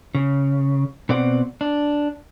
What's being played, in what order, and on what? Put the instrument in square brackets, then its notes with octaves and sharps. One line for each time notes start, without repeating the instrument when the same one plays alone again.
[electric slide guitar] C#3
B2 C4 D5 F#5
D4